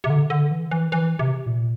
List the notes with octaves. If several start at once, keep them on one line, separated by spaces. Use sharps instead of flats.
C3
D3
D3
E3
E3
E3
C3
A#2